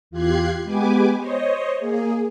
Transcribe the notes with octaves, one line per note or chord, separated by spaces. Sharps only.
E2 F4 G4 F#6 G#6 C7
G#3 B3 G4 B4 G#5 D6
C5 C#5 D#5
A#3 G#4